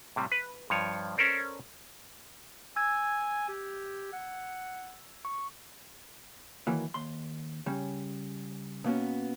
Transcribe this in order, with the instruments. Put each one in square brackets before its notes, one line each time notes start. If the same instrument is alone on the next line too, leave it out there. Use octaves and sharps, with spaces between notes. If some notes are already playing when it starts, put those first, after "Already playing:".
[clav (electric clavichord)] A2 C3 G3
B4
G2 F3 C#5
C#4 A4 A#4 C5 D5
[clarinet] G#5 [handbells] E6 G#6
[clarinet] G4
F#5
[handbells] C#6
[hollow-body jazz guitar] D#3 E3 F#3 A#3
D#2 C6
C#3 G3 C#4
B2 A#3 B3 C#4 F#4